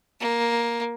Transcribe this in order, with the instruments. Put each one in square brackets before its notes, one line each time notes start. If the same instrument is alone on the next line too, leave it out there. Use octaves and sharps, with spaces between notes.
[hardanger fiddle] A#3